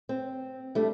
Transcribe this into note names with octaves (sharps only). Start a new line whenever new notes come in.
C4
G3 A3 D4